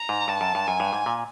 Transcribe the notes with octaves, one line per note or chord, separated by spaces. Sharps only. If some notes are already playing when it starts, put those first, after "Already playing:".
Already playing: A#5
G#2
G2 A5
F#2
G2
F#2 G#5
G2
G#2
A#2